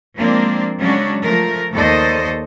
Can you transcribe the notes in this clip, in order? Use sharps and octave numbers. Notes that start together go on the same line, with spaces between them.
F3 G#3 A#3 C4 D4
C#3 F#3 G#3 C#4 D4 F#4
F3 A3 A#4
D#2 A4 C5 D5 D#5